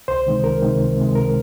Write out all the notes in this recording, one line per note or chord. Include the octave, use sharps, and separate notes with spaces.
C#2 C5
C3 D#3 G#3
C#2 A#4
C3 D#3 G#3
C#2
C3 D#3 G#3
C#2 A#4